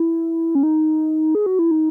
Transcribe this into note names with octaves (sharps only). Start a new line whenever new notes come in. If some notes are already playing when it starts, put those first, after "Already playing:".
Already playing: E4
C#4
D#4
G#4
F#4
E4
D#4